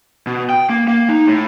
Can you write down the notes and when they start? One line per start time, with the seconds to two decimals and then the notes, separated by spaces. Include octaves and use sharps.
0.27 B2
0.49 G5
0.70 A#3
0.88 A#3
1.09 D#4
1.27 A2